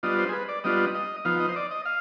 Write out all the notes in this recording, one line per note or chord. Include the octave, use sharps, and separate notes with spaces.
G3 B3 D4 F4 D#5
C5
G#4
B4
D5
G3 B3 D4 F4 D#5
D#5
F3 B3 D#4 F5
D#5
C5
D5
D#5
F5